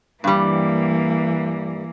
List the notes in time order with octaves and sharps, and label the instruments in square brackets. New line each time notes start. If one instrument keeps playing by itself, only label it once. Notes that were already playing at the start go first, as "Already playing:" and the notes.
[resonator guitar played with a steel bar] G2 G3 [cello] E3 A#3